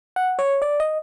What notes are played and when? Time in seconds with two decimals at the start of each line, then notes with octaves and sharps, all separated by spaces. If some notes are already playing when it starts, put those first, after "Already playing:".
0.16 F#5
0.39 C#5
0.62 D5
0.80 D#5